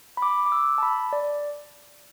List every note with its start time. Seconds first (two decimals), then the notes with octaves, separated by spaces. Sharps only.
0.17 B5
0.22 D6
0.46 D6
0.52 E6
0.78 A5
0.83 B5
1.13 D5